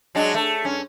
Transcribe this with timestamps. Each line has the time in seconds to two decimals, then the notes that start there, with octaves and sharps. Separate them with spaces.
0.15 F#3 G#3 D4
0.34 A3
0.65 G2 C#4